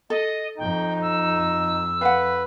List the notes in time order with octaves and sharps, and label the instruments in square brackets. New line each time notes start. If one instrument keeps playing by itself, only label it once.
[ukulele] A4 [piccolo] D#5
[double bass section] F2 [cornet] D#4 [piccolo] G5
[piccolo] E6
[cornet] B4 [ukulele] F5 F#5